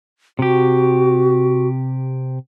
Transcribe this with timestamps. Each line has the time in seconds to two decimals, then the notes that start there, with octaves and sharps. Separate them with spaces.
0.39 C3 F#4 G4